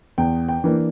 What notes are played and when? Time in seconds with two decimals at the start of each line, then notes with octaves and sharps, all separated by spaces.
0.18 E2 G5
0.48 G5
0.64 E3 A#3 D4